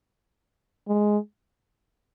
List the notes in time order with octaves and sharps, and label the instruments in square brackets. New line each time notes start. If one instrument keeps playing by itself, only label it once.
[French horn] G#3